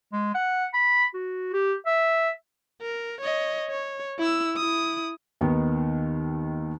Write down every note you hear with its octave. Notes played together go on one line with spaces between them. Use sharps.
G#3
F#5
B5
F#4
G4
E5
A#4
C#5 D#5
C#5
E4 E6
E4 D#6
D#2 D#3 B3